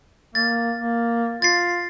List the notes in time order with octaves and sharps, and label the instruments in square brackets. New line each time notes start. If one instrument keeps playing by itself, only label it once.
[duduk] A#3 [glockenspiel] A6
[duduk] A#3
[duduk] F4 [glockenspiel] A6 C7